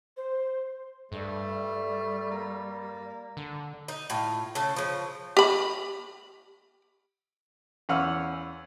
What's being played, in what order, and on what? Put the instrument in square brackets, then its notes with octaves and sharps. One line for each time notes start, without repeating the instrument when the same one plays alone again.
[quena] C5
[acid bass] G2 [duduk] G3 [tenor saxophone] A3
[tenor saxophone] A#3
[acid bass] D3
[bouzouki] D#4
A2 F4
C#3 A4
C#3 F3
[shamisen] G4 B5
[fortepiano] E2 C#4 F5 F#5 E6 F6